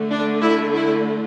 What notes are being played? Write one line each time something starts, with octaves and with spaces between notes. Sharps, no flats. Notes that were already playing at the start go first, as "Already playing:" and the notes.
Already playing: D3 A3
D4
E4
E4